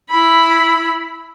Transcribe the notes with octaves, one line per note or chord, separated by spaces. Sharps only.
E4 B5